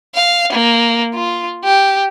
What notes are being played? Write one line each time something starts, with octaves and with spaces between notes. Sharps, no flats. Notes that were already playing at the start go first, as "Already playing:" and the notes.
F5
A#3
F4
G4